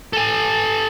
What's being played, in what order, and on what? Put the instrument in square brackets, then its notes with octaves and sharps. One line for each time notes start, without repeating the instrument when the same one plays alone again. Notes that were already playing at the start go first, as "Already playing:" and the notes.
[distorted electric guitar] A4 G#5